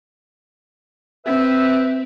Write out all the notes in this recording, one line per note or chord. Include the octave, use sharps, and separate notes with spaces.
C4 B4 E5